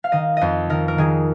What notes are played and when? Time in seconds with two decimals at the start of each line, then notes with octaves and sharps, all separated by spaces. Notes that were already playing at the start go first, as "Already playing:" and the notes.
0.04 F5
0.12 D#3 D#5
0.37 F2 C5 D#5
0.70 D#3 A#4
0.88 A#4
0.98 D#3 G#4